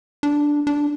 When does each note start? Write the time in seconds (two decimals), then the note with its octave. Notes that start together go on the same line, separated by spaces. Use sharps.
0.23 D4
0.67 D4